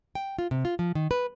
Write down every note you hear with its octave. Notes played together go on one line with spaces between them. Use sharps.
G5
F4
C3
F4
F3
D#3
B4